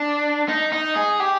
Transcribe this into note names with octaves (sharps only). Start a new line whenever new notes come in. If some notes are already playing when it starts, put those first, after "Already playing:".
Already playing: D4
D#4
D#4
G#4
G4